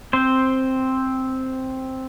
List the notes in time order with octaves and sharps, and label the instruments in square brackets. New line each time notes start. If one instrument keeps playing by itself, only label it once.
[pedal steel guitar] C4 C5